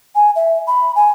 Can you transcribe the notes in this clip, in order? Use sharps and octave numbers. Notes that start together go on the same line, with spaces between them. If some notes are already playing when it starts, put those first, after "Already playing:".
G#5
E5
B5
G#5